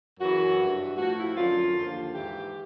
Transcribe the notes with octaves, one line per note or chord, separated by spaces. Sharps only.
F#2 C#3 E3 F#4
G2 E3
A2 F3 F#4
E4
F#2 D3 F3 F4
D#2 D3 F3
G#2 E3 G4